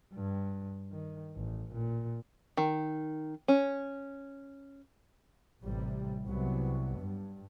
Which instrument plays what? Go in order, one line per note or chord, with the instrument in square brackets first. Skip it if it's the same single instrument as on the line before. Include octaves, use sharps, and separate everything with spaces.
[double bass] G2
D#3
A1
A#2
[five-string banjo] D#3
C#4
[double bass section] A1 C3 G3
C2 F#3 B3
G2